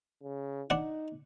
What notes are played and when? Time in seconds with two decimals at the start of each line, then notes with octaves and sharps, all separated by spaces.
0.23 C#3
0.70 D4 D#4 F#5